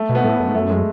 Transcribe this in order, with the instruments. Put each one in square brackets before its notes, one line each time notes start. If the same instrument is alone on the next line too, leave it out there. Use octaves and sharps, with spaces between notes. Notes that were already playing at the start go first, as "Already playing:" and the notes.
Already playing: [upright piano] A3
[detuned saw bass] B2
[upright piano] B3
[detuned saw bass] A2 [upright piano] A3
[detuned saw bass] F#2
G#2
[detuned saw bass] F#2 [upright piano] A3
[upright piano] G#3